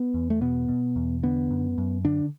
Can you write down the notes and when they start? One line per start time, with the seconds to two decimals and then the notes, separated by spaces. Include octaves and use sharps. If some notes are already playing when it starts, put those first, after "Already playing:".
Already playing: B3
0.14 E2
0.30 A3
0.41 B2 B3
0.68 B2
0.96 E2
1.23 D3 B3
1.51 F#2
1.78 F#2
2.05 D3 D4